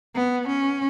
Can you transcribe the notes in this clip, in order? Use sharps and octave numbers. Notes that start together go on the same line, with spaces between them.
B3
C#4